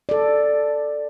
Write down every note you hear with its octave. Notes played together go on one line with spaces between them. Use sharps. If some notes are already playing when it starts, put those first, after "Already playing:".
A4 D5